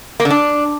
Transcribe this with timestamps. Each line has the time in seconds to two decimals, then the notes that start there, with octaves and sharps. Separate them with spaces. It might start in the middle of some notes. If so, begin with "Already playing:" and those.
0.20 A#3
0.25 D3
0.30 D4